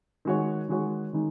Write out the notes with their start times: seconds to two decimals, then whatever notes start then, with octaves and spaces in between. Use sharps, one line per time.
0.25 D#3 G#3 F#4 C#5
0.68 D#3 G#3 F#4 C#5
1.13 D#3 G#3 D#4